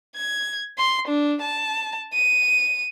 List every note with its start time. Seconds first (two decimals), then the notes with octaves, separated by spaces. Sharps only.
0.16 G#6
0.78 C6
1.08 D4
1.41 A5
2.14 D#7